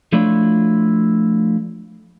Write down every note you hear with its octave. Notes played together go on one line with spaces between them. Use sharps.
F3 A3 D4 E4 F4 C#5